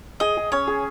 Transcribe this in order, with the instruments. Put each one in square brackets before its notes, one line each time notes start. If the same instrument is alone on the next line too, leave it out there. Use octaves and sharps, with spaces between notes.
[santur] G#4 [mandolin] D#5
[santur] G#4
[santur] C#4 [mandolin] C#5
[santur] G#4